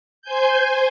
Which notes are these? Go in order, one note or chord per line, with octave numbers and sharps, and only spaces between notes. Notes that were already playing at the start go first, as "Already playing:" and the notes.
C5 G#5 G6